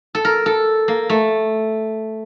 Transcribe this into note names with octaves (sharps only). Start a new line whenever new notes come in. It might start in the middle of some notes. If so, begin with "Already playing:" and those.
A4
A#4
A4
A#3
A3